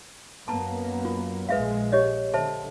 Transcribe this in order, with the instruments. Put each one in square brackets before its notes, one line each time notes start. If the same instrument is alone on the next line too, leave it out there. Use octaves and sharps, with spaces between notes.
[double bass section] F#2 A#3 B3 [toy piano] A5 A#5
[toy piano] F4
[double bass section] A#1 G#3 [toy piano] B4 E5 F5
[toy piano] G4 C#5 D#5
[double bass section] D3 [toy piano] C5 E5 A5